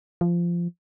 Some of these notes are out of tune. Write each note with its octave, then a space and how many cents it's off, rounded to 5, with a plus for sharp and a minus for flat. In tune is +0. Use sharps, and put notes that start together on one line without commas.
F3 -15